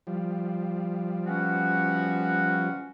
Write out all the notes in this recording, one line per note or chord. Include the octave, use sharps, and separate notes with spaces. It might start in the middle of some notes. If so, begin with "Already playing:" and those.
F3 G3
B3 C#4 F#4